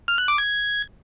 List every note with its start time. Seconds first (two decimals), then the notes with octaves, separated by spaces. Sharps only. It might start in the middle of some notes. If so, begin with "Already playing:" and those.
0.08 F6
0.18 F#6
0.28 D6
0.38 G#6